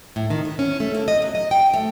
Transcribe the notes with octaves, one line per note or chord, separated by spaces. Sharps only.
A2
D#3
B3
C#4
A3
A#3
D#5
F#3
D#5
G5
A3